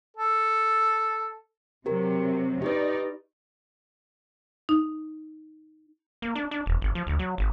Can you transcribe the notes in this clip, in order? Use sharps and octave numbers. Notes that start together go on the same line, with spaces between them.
A4
C3 F#3 G4 A#4
D#4 G4 B4 D5
D#4
A#3
D4
D4
E1
G#1
F3
D2
F#3
G#1